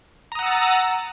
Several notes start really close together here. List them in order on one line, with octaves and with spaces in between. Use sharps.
A#5 D#6 F#5 E6 A6